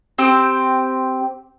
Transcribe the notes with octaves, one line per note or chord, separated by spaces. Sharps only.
C4 G4 C5